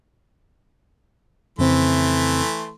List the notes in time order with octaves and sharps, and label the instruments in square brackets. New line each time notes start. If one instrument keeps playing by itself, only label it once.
[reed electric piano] F2 C#3 C4 [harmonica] E3 A3 C6